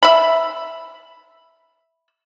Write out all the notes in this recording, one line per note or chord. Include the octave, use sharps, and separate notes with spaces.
E5 B5